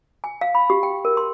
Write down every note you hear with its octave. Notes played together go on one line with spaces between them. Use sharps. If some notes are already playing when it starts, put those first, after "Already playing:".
G#5
F5
B5
G4
G5
A#4
C6